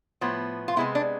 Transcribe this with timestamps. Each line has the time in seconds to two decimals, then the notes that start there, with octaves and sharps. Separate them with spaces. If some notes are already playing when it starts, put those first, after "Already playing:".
0.21 A2 F3 B3
0.68 F4
0.76 C3 G#3 B3 E4
0.95 D4